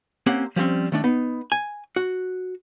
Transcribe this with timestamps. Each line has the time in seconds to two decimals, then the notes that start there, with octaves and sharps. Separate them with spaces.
0.26 A#3 C4 C#4 G4 F#5
0.56 F3 G3 G#3 C4 C#4
0.92 D#3 A3 D4
1.04 B3 D#4
1.52 G#5
1.96 F#4